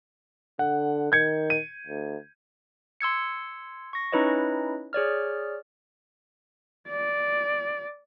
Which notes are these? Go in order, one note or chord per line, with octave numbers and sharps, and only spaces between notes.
D3 F#5
D#3 G6 G#6 C#7
D#7
D2
C6 E6 G#6 C#7
C#6 A#6
C#4 D#4 E4 B4 C#5 D#5
G#4 C#5 D5 F6
D5